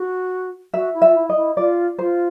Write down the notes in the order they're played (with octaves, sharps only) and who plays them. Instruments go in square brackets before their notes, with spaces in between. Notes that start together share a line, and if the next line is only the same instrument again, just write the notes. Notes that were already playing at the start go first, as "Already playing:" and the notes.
Already playing: [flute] F#4
[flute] F#4 [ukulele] E5
[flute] E4
[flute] F4 [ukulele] E5
[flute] E4
[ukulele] D#5
[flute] E4
[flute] F4 [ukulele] D5
[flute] F4 [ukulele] C5